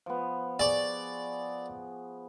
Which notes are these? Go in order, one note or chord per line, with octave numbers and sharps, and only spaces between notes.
F3 B3
G#4 D5 C#6